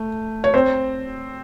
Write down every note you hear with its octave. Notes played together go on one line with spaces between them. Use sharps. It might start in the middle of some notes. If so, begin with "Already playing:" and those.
Already playing: A3
C#5
C4 C5